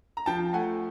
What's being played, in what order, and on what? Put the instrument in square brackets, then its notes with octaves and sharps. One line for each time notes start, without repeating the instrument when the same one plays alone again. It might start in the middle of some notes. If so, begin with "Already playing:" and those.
[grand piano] A#5
F3 G5 A5
A3 F#5 G#5